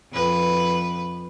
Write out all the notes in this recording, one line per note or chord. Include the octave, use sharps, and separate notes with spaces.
F2 B4